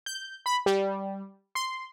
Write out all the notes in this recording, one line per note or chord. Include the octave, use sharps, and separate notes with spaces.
G6
B5
G3
C6